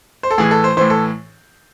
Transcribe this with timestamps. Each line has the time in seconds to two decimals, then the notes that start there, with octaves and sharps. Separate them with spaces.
0.23 C5
0.31 A4
0.38 A2 E3 G#4
0.51 A4
0.64 C5
0.77 A2 E3 C5
0.90 A4